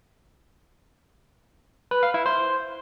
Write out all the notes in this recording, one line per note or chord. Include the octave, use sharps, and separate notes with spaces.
B4
F5
E4
C5